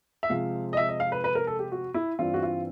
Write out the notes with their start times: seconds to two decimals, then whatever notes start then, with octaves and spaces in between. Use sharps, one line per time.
0.23 E5
0.29 C3 F3 G#3 F5
0.73 D#5
0.77 E5
0.89 D#5
1.00 F5
1.12 B4
1.24 B4
1.35 A#4
1.47 A4
1.59 G4
1.72 F#4
1.94 E4
2.19 G2 E3 G3 C4 F4
2.34 F#4
2.43 F4